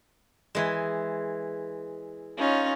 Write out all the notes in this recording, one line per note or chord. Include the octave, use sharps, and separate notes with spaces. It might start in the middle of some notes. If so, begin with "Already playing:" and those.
E3 G#3
C#4 D#4 F4